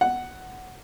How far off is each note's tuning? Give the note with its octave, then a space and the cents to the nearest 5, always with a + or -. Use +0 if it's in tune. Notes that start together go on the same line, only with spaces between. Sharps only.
F#5 +5